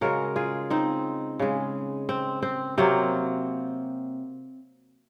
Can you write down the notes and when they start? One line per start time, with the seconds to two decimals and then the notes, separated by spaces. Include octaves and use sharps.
0.01 C#3 G#3 F#4 A#4
0.36 F4 G#4
0.70 C4 D#4
1.39 C#3 G#3
2.09 C4
2.43 C4
2.77 C3 F#3 A#3 C4